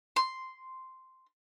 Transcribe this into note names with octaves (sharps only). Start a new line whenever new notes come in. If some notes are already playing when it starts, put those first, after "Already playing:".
C6